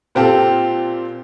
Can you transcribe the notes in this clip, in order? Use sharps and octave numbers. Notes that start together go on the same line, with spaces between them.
A#2 C4 F4 G4 A4